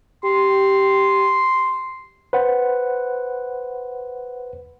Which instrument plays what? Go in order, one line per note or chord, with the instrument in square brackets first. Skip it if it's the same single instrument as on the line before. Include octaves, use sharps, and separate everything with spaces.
[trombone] G4 [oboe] C6
[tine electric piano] B4 C5 F#5